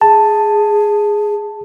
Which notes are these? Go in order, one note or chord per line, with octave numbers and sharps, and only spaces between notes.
G#4 A5